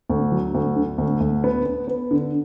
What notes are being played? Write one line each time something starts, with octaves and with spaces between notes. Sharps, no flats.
D2
F#3
D2
D3
D2
D2
B3
B3
B3
D3